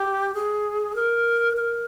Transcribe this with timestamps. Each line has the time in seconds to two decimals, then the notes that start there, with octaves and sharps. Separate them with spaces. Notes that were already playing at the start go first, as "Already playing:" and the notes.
Already playing: G4
0.34 G#4
0.96 A#4
1.57 A#4